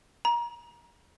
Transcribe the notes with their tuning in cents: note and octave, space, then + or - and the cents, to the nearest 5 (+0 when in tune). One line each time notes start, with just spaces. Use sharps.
A#5 +30